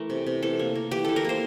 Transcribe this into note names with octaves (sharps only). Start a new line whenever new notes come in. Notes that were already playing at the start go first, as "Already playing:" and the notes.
Already playing: E3 A3 A#4
C3
C3
E3 A4
A#3
A#3
E3 G4
E3 A4
A#4
A#3 C5